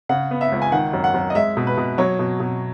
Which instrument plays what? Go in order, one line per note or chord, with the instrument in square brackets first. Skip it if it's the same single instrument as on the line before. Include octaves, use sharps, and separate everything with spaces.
[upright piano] C#3 F#5
B3
E5
C#2
G#5
D#3 F#5
F#2
F#5
F#2
D#5
G#3 E5
B2
B4
B2
F#3 C#5
B2
B2